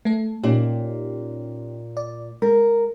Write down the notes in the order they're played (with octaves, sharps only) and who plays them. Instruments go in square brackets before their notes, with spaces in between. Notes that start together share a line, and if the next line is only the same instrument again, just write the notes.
[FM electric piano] A3 A4
[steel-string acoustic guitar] A#2 [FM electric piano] C#4 D#4 G4
[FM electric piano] D5
[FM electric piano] G#3 [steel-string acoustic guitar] A#4